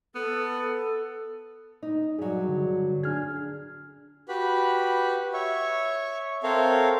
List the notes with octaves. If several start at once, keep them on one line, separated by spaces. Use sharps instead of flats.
B3 A4
D#4
G2 F#3 G#4
D3
D4 G#4 F6 G#6
F#4 G4 B4 B5
C#5 E5 C#6
C4 A4 A#4 C#5 E5 F5